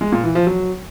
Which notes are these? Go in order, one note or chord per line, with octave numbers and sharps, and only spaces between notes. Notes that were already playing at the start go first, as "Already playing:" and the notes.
G#3
A#2
E3
F3
F#3